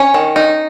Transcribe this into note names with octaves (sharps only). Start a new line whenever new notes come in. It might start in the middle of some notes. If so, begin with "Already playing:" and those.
Already playing: C#4 C#5
D#3
D#4